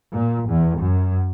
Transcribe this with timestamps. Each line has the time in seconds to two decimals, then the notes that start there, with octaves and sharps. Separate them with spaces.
0.12 A#2
0.49 E2
0.78 F#2